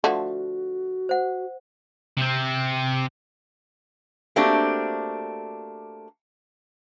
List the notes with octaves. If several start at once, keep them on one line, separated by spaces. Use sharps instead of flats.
D3 F3 A3 F#4
C5 F#5
C3 C4
A3 A#3 C4 D4 F#4 G4